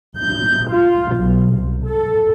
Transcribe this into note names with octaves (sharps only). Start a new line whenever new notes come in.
G6
F4
B1
C2
A4